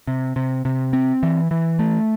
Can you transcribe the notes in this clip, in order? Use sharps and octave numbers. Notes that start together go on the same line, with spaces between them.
C3
C3
C3
C4
E3
E3
A3